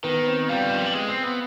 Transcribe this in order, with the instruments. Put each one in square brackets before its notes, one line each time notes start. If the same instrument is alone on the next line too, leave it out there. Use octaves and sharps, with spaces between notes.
[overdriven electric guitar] D#3 [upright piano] B3 B4
[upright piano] C4 C5
[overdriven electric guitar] G3 [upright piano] F4 F5
[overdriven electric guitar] D3
[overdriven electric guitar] D#3 [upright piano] F4 F5
[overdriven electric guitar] F3
G3
G#3
C4
B3